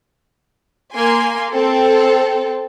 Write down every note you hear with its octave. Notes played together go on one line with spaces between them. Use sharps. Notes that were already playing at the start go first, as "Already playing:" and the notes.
A#3 G#5 C6
C4 A4